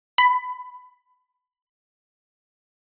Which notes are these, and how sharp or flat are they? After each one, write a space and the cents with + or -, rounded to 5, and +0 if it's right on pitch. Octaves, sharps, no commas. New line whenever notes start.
B5 +20